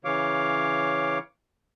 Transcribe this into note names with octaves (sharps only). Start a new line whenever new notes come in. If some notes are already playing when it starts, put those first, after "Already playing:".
C#3 E3 C#5 F5 D6